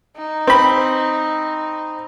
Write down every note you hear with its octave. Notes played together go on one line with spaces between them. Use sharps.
D#4
C4 B5